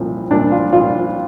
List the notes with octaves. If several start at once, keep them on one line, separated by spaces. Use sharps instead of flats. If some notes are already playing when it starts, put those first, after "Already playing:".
Already playing: C2 A#2 F3
C2 A#2 F3 D4
F4
C2 A#2 F3 F4